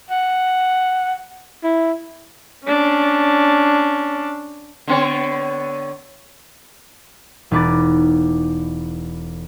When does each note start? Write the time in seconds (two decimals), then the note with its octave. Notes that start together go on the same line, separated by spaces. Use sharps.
0.11 F#5
1.64 E4
2.67 C#4 D4
4.87 D3 B3 C#5
7.51 E1 D#4 B4 D6 A6